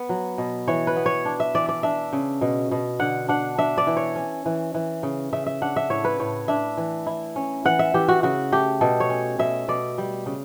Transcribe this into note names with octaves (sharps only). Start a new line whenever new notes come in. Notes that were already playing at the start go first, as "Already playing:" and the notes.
Already playing: B3
F#3
B2
E3 C#5
B4
B3
C#5
D4
E5
E3 D5
D5
D4 E5
C#3
B2
B2
D3 F#5
D4 F#5
D4 E5
D5
E3
C#5
C#4
E3
E3
C#3
C#3 E5
E5
D4 F#5
E5
A2 C#5
B4
A2 C#5
D4 E5
E3
E4
C#4
E3 F#5
E5
E3 G4
F#4
C#3 F#4
A3 G4
B2 A4
C#5
C#4
B2 E5
B2 D5
G3
C#3